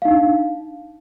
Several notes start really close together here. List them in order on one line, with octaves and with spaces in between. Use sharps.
F5 D#4 D4